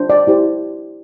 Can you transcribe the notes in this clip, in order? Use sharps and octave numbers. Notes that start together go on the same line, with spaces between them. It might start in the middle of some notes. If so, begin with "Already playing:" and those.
Already playing: D4 C5
D5
E4 G4 C5